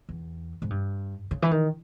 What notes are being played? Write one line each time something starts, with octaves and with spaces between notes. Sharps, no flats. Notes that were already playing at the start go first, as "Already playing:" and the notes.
E2
G#2
G2
C#3
E3
D#3